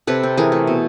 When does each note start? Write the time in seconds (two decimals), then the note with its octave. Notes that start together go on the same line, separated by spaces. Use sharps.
0.07 C3 A4 B4
0.23 C4
0.37 E3 G#4 A#4
0.52 A3
0.67 B2